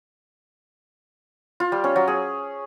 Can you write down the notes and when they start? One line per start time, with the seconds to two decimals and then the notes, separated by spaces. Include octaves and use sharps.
1.60 F4
1.72 G3
1.84 C#4
1.96 F#3
2.08 G#4